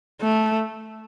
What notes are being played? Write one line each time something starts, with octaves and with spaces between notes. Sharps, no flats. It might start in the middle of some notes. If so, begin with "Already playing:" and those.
A3